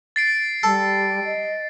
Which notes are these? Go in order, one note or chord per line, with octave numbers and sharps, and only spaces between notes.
A6 C7 D7
G3 A4
D#5